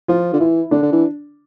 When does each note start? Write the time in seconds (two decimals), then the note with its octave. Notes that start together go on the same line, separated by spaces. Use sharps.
0.08 F3 F4
0.33 D3
0.40 E3 E4
0.71 D3 D4
0.83 D3
0.92 E3